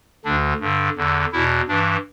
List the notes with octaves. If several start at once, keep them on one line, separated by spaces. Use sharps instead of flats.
D2 D3 D4
G2 D3
E2 D3
E2 B2 E4
G2 E3 D4